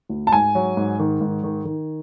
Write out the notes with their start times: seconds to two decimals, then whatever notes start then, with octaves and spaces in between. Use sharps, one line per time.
0.09 D2
0.27 A5
0.32 G#2 G#5
0.55 F#3
0.77 G#2
1.00 D#3
1.21 G#2
1.44 D#3
1.65 D#3